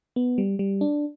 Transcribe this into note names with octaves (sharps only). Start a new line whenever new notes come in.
B3
G3
G3
D4